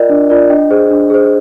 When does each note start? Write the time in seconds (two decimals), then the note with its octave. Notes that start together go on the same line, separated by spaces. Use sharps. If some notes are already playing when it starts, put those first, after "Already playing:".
Already playing: F4 A#4 D5 D#5 G5
0.10 D4
0.30 F4 A#4 D5
0.50 D4 D#5 G5
0.71 G#4 C5
0.90 D4
1.10 G#4 C5